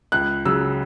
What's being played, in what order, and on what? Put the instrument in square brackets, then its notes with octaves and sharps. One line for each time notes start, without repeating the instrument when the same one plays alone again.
[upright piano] C#2 F#6
C#3 F#3 E6